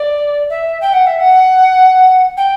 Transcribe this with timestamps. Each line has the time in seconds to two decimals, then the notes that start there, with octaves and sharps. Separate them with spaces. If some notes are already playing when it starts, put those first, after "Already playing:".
Already playing: D5
0.50 E5
0.81 G5
0.93 F#5
1.07 E5
1.20 F#5
2.37 G5